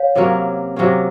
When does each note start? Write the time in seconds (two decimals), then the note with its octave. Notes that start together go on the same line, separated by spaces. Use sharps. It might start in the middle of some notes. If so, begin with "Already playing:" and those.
Already playing: C#5 F5
0.15 C3 F#3 A#3 C#4
0.76 C3 F#3 A#3 C#4